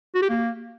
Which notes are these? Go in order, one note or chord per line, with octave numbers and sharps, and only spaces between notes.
F#4
G4
A#3